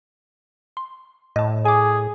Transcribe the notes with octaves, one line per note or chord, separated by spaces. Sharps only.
C6
A2 D#5 A5
G#4 G#5 D6